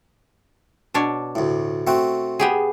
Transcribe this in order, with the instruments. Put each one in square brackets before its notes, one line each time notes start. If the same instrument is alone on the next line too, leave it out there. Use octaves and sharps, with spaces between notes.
[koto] B2 D4 C#5
[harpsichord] D2 A2
A3 C4 F#4
[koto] B3 G4 G#4